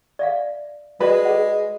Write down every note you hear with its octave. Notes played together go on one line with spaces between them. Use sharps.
D5 E5 F5
G#3 F#4 B4 D5 G5
G#4 F#5